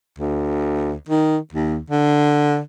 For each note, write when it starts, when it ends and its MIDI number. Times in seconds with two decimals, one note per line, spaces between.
0.19 0.93 38
1.09 1.37 51
1.53 1.78 39
1.90 2.59 50